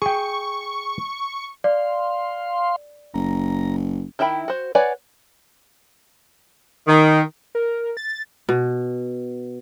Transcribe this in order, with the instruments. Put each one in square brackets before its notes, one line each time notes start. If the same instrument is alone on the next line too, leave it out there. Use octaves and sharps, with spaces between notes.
[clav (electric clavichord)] G#4 G5 [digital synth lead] C#6
[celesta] D5 [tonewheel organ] F5 C6
[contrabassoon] F#1 [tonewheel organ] A#5
[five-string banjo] D#3 E4 E5 G5 B5
F#4 C5
B4 C#5 D5 F#5 G#5
[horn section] D#3
[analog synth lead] A#4
A6
[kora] B2